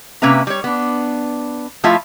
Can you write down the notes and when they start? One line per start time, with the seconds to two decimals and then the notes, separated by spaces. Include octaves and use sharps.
0.22 C3 A#3 C#4 B4 E5 A#5
0.47 G3 C#5
0.64 B3 D4
1.84 F3 A3 E4 F4 E5 F5